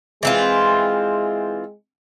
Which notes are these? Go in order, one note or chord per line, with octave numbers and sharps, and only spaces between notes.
E3 G#3 C4 F4